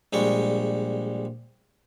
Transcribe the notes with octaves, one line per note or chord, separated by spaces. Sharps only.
A#1 G3 G#3 C#6